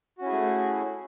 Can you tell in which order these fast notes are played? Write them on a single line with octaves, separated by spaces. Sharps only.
F#4 C#4 E4 G#4 A3